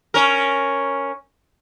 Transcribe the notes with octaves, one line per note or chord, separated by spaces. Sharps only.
C#4 A#4